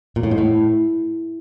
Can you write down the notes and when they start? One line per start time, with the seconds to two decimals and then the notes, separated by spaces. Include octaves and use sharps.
0.16 A#2
0.23 A2
0.31 G#2
0.38 A2